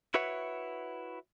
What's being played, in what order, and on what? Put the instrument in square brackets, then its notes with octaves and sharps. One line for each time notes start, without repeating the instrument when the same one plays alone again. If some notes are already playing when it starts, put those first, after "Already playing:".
[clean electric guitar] E4 F#4 B4 C#5 E5 F#5